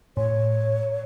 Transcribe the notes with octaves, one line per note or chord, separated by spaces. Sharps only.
A2 C#5